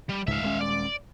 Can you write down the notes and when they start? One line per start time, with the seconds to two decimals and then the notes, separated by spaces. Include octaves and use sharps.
0.10 G3
0.28 C#2 G#2 E5 F5
0.42 D#1 G#3 C#4
0.61 D5